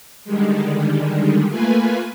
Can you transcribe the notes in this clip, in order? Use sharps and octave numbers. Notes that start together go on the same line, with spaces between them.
D3 D#3 G3 G#3
A3 A#3 F4 B4 G#5